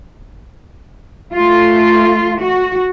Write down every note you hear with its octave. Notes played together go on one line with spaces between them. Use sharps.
A3 F4
F#4